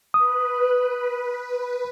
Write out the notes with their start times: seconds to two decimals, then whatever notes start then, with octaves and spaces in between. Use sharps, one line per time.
0.14 B4 D#6